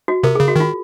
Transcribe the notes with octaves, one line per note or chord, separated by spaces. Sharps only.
F#4
C3 A#4
C#3 G#4
F#4
D#3 F4